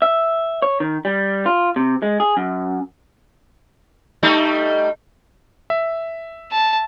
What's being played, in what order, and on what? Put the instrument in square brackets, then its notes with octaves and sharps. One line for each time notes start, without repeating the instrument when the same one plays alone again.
[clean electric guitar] E5
C#5
D#3
G3
F4
C3
G#3
G#4
F#2
[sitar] G3 A3 D#4
[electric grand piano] E5
[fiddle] A5